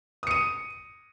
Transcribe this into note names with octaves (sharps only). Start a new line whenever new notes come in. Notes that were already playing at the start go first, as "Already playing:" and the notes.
D#6 C#7 D#7